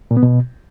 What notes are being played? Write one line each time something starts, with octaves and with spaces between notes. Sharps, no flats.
A#2
B3
B2